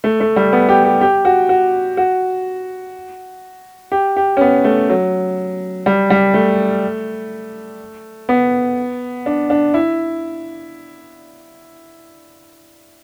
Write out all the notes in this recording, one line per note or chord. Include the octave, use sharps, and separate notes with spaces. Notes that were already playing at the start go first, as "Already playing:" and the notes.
A3
A3
G3
B3
G4
G4
G4
F#4
F#4
F#4
G4
G4
C#4
B3
A3
F#3
G3
G3
A3
B3
D4
D4
E4